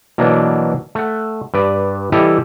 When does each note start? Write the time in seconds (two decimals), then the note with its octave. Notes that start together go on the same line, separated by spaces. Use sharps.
0.18 B2 E3 F#3 A#3 B3 D4
0.95 A3 F#5
1.54 G2 B4 D5
2.12 E3 G3 E4 G4 A4 D#5